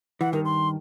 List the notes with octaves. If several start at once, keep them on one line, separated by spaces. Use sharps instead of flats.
E3 F#5
G2 D#3 A#4
C6